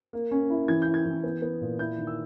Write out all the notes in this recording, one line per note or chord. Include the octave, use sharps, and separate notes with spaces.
A#3
C#4
E4
E3 G#6
G6
E4
G#6
E3
B3
B3
A#2
E4 G6
D#3
E6